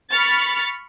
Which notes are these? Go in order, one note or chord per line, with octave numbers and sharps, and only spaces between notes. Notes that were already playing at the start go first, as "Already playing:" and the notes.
B5 C#6 F6 A6